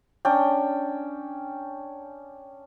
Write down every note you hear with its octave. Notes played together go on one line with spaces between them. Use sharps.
C#4 D4 G5